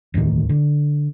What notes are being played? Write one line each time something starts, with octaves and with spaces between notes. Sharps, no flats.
E1 D2 A2 D#3
D3